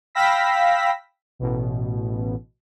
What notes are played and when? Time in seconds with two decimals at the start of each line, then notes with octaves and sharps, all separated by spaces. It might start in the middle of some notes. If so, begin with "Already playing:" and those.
0.15 F5 G5 B5 E6 A#6 B6
1.39 A1 B2